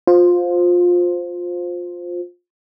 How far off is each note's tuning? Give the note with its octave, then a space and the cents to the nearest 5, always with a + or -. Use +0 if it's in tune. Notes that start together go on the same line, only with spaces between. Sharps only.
F4 +20 C5 +0